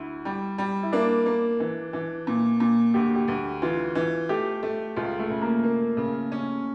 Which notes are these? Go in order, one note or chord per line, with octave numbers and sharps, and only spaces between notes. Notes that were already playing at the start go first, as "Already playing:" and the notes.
Already playing: D2 E4
G3
G3
E4
A#3 D4
A#3
E3
E3
A#2
A#2
D2 G4
G4
D2
E3 F4
E3
A3 G4
A3
C#2 F4
A3
C#3
A#3
A#3
C#3
C#4